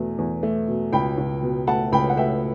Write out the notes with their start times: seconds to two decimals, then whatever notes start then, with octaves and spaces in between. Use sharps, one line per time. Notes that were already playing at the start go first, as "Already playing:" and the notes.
Already playing: E2 B2 A3
0.18 E2
0.43 A3
0.68 B2
0.93 C#2 G5 B5
1.18 C#2
1.42 B2
1.67 A3 F#5 A5
1.92 C#2 G5 B5
2.10 F#5
2.17 A3 E5 G5